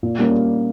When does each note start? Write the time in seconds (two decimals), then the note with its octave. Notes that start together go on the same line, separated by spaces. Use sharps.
0.03 A#2
0.18 G3 A#3 C#4